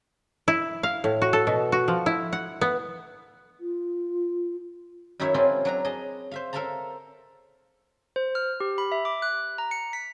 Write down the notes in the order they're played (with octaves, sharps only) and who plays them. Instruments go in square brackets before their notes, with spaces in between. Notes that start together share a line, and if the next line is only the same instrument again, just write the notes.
[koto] E4
F5
A2
F#4
A4
B2
F#4
F3
E4
F#5
B3
[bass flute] F4
[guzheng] F#2 D#3 D#4 E4 C#5 E5
C4 C#4 E4 F4 G#4 D5
F#3 D4 A#5
G#4 D#5 A5
C5 E5 F5
A4 A#4 E5 F5 A5 A#5
[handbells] C5
F6
G4
B5
E5
D6
F#6
A#5
C#7
B6